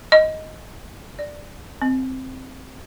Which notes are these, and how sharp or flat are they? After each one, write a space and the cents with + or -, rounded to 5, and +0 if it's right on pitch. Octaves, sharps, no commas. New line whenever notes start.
D#5 +10
D5 +5
C4 +0